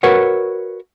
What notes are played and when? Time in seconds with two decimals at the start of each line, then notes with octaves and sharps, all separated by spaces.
0.03 F#4 A#4 B4 C#5 E5 F#5